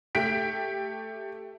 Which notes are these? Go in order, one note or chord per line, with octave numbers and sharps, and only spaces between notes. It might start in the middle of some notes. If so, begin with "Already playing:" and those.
A3 G4 G5 B6 D7